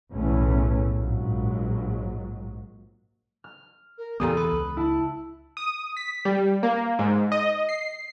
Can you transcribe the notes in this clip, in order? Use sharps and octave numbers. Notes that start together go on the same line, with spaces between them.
B1 E2 A2 E3 A3 C#4
A#1 G#2 F#3
F6
A#4
E2 A#2 C#3 E3 G3 B3 A4 D#6
B4
C#2
E4 A5
D#6
B6
G3
A#3
G#2
D#5
C7